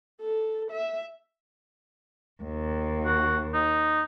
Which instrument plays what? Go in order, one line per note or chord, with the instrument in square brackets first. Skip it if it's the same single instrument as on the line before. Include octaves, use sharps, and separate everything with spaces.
[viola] A4
E5
[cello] D#2
[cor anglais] F#4
D#4